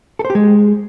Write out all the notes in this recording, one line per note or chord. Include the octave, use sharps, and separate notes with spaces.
A4
C5
G4
G#3